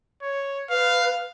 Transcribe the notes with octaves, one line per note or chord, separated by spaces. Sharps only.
C#5
B4 F5